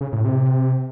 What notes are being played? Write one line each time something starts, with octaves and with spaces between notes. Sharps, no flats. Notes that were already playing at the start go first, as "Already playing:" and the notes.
C#3
A2
C3